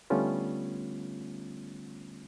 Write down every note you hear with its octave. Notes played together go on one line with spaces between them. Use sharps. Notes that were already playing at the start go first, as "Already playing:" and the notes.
D3 G3 A3 B3 C#4 F4